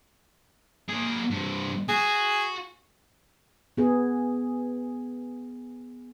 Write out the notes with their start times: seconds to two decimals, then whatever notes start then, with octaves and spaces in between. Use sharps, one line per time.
0.89 A#3 G#4
1.31 G2 C3
1.89 F#4 G#4
3.77 B3 G#4